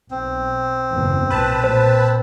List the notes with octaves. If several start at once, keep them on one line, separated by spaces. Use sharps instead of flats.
B1 C4
F#1 E2
B1 A#2 B4 A5
A#2 C5